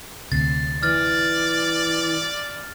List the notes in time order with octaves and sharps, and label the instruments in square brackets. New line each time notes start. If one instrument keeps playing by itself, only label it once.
[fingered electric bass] D2 C3 [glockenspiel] A6 [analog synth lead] C7
[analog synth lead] E3 [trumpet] D5 [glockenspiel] F6 A6